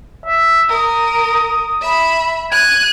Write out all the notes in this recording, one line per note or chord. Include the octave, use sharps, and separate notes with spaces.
E5
A#4 D#6
E5 B5
F#6 G#6 D#7